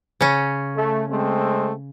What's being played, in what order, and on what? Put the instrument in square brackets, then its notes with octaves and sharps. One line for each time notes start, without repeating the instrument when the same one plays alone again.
[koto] C#3 C#4
[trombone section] A3
G#3 A3 C4